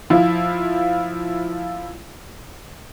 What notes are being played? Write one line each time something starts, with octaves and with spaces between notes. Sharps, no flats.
F3 E4 F4